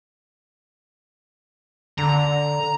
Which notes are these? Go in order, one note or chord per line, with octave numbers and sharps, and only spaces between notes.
D3 A#5